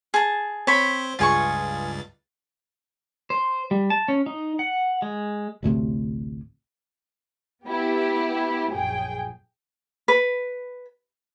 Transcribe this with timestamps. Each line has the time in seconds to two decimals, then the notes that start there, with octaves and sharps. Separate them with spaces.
0.14 G#4 A5
0.67 C4 C5 C#5 B5
1.19 C#2 G2 F4 G#4 C#6 A6
3.30 C5
3.71 G3
3.90 A5
4.08 C#4
4.26 D#4
4.59 F#5
5.02 G#3
5.63 A1 D2 A2 C3
7.65 B3 E4 G4
8.72 A#1 F#2 G#4 G5
10.08 B4